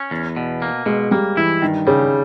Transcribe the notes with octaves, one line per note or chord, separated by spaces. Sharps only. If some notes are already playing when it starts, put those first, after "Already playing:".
Already playing: C#4
E2
B2
A#3
B2 G#3
G3 A#3
E3 E4
G2 D#3
C#3 G3